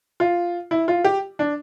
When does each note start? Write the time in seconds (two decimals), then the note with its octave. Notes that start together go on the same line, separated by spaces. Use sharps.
0.20 F4
0.71 E4
0.88 F4
1.04 G4
1.39 D4